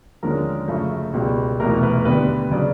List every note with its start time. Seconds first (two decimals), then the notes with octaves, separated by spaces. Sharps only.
0.23 D#2 D3 F3 G#3 C#4 A#4
0.68 F#2 C#3 F3 A3
1.13 C#2 B2 G3
1.60 F1 E2 B2 A#4
1.83 B4
2.05 D#2 D3 G3 B3 B4
2.51 C#3 F#3 D5